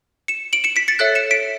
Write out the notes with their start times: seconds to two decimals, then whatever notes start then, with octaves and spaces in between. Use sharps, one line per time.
0.28 C#7 E7
0.53 D7 F#7
0.64 C#7 E7
0.76 B6 D7
0.88 A6 C#7
0.99 A4 C#5 E5 F#6 A6
1.15 C#7 E7
1.31 B6 D7